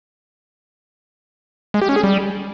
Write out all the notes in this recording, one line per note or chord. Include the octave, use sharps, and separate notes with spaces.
G#3
G4
C#4
G#4
G3